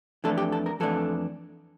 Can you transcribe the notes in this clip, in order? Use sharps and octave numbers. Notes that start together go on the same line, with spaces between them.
F2 E3 A3 D4 A4
G4
A4
A#4
F2 E3 A3 D4 A4